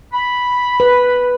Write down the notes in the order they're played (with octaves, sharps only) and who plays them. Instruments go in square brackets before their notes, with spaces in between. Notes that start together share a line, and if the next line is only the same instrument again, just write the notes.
[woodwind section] B5
[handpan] B4